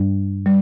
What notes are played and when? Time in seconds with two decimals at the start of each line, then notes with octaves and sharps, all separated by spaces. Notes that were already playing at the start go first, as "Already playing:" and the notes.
Already playing: G2 G3 D4
0.46 G3